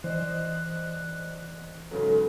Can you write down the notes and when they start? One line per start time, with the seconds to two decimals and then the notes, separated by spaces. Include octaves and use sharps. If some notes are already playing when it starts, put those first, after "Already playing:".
0.04 E3 C5 D5 D#5 F#6
1.91 G#2 C#3 F#3 A4 B4